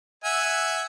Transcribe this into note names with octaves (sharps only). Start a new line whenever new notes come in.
E5 F#5 G#5